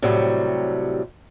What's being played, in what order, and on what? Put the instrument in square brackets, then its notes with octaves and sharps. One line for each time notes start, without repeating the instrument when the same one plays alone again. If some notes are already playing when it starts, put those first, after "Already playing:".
[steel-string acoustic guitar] A2 C3 F#3 G3